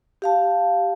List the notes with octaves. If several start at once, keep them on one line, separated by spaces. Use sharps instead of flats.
G4 F5 A5